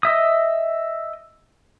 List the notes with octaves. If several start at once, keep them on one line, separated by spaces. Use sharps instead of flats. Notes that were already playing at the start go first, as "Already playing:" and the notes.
D#5 E5 D#6